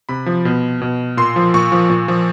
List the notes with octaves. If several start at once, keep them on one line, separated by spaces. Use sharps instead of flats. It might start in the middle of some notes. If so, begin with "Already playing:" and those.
C3 B5
F3
B2
B2
A#2 C6
F3
A#2 C#6
F3
A#2
F3